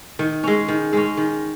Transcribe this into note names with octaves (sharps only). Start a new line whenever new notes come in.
D#3
G#3 C#4
D#3
G#3 C#4
D#3